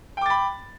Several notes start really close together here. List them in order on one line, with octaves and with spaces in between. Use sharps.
G5 D6 A6 B5